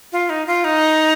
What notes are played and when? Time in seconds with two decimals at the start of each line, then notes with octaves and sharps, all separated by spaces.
0.12 F4
0.30 D#4
0.47 F4
0.64 D#4